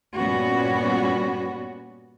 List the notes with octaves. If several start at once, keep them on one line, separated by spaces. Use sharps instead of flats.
G2 A#2 G3 B3 C#4 F#4